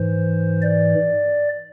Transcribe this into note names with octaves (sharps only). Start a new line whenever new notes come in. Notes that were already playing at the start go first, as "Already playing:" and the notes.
Already playing: G#2 E3 C5
D5